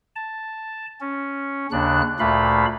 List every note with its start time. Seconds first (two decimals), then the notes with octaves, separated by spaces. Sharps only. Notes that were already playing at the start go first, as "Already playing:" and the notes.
0.16 A5
1.01 C#4
1.72 D#2 C#3 D4 F#6
2.20 D2 A#2 A3 F5 B5